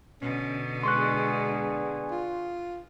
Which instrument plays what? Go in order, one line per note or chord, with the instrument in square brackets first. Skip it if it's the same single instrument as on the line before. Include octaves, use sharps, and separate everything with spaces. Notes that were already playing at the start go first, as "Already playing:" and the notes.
[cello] B2 D3 [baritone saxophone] C#4
[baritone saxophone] G#3 [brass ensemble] B3 D4 G#4 [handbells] C6 C#6 F#6
[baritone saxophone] F4